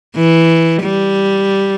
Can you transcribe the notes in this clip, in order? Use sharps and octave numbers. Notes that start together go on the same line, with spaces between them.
E3
G3